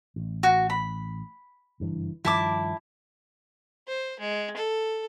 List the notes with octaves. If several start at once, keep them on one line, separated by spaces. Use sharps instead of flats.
A1
F#4
B5
F#1 G2 E3
G2 D#3 F3 E4 A5 D6
C5
G#3
A4